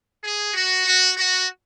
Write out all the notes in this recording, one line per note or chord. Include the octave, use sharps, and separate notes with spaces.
G#4
F#4
F#4
F#4